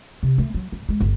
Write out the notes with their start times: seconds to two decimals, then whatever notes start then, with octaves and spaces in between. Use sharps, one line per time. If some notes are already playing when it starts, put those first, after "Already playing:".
0.23 C3
0.38 A3
0.54 F#3
0.72 G2
0.89 G#3
1.00 G1